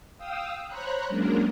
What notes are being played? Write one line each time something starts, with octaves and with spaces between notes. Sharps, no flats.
F5 G5 D#6 E6
C5 C#5 A#5 B5 F#6
F#3 G#3 A#3 C#4 D4 A#4